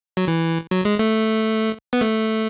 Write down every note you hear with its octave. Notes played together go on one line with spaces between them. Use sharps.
F#3
E3
F#3
G#3
A3
B3
A3